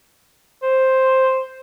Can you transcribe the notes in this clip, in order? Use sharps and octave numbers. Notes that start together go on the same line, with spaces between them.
C5